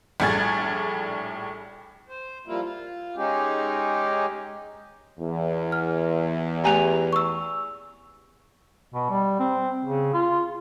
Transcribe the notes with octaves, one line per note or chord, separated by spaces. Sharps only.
A#1 A2 G3 G#4 G#6 A6
C5
F3 G3 A#3 E4 F4
F4
G#3 C#4 D#4 G4 G#4
E2
F6
A3 G4 G#5 A#5 D#7 F7
C#6 E6
B2
G3
C4
C#3
F4